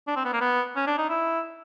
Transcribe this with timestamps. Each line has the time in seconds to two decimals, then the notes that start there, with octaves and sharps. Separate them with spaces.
0.07 D4
0.16 C4
0.25 B3
0.33 A#3
0.41 B3
0.76 C#4
0.87 D4
0.98 D#4
1.09 E4